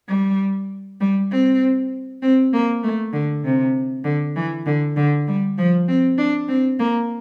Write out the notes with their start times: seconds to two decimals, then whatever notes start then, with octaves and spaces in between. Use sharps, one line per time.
0.08 G3
1.01 G3
1.31 C4
2.22 C4
2.53 A#3
2.83 A3
3.13 D3
3.44 C3
4.04 D3
4.36 E3
4.66 D3
4.96 D3
5.28 G3
5.58 F3
5.88 C4
6.18 D4
6.48 C4
6.79 A#3